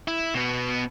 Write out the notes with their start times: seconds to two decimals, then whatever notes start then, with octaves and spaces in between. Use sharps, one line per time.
0.08 E4
0.34 B2 B3